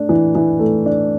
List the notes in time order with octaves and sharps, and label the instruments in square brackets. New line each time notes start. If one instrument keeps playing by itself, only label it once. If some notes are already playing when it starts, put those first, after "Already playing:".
Already playing: [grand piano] A3 D4
E3
E3
A3
D4